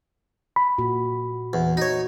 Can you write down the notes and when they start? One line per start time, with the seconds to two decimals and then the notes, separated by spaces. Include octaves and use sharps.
0.56 B5
0.78 A#2 F#4
1.53 E2
1.77 D#4 F#4 C#5